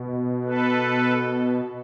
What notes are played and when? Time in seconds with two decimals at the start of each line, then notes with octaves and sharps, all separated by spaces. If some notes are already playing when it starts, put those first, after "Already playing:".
Already playing: B2
0.44 A4 B4